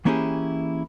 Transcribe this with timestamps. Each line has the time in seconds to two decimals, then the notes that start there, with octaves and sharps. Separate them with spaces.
0.05 E3 A#3 C#4 E4 G4 G#4